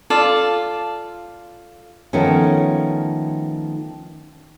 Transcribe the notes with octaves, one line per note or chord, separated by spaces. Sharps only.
F4 A4 D5 F5
D#3 F3 A3 B3 C#4